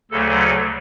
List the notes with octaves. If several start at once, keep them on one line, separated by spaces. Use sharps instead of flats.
D2 C#3 F#3 A3 A4
A4